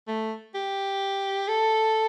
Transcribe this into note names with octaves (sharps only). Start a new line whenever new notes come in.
A3
G4
A4